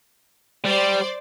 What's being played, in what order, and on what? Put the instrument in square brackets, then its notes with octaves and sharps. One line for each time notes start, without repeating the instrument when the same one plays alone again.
[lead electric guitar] G3 [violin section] C5 D5